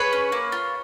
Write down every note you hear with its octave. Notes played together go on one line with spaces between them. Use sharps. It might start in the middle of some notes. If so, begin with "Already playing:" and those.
Already playing: G#4 B4 C#5
C#4
A#3
F4